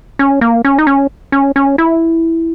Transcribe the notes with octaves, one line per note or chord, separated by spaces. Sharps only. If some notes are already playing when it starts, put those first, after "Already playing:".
C#4
A#3
C#4
D#4
C#4
C#4
C#4
E4